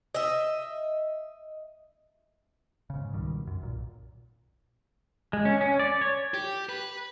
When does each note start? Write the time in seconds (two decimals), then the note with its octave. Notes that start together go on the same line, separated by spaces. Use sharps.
0.15 D#5 E5
2.90 G#2 C#3
3.14 C#2 B2 D#3 G3
3.47 F#2
3.61 B1 A#2
5.33 G#3
5.45 C#4
5.61 C#4
5.80 D5
6.01 C#5
6.34 G4
6.69 B4